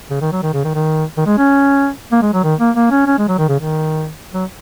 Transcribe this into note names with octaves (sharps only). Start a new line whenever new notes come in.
C#3
D#3
F#3
D#3
C#3
D#3
D#3
D#3
G#3
C#4
A#3
G#3
F#3
D#3
A#3
A#3
C#4
C#4
G#3
F#3
D#3
C#3
D#3
F#3